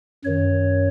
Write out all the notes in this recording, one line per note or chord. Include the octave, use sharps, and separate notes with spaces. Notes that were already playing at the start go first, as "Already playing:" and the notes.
F#2 D#3 C#5